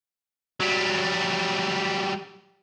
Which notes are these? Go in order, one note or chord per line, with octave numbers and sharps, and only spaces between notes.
F#3 G3